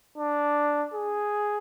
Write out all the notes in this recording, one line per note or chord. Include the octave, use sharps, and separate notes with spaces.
D4
G#4